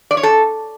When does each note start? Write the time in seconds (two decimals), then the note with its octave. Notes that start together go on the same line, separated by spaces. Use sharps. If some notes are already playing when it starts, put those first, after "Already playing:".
0.11 D5
0.17 C#5
0.23 A4